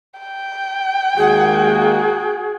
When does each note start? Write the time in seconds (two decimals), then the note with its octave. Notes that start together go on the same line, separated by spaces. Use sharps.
0.20 G5
1.17 D#2 G#3 A#3 F#4 G#4